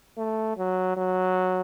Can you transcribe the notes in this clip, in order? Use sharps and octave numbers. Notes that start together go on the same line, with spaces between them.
A3
F#3
F#3